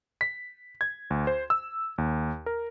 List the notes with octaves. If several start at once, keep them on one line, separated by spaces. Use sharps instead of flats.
B6
G#6
D2
C5
E6
D#2
A#4